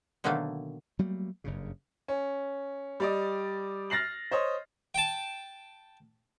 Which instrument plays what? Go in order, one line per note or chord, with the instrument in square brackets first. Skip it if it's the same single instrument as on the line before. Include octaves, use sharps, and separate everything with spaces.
[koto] B2 D3 D#3 F#3 A3 A#3
[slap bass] F#3 G3 A3 A#3
F#1 G2 C#3
[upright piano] C#4
G3 D5 D#5
F6 A6 A#6 C7 F#7
C5 C#5 D#5
[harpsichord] G5 A5